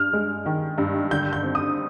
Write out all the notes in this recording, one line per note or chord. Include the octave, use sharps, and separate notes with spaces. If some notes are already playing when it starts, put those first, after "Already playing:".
Already playing: G2 F6
G#3
D#3
G2
D3 G6
G6
C4
D#6